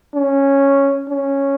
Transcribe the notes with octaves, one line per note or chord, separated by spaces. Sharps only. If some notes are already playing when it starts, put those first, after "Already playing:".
C#4
C#4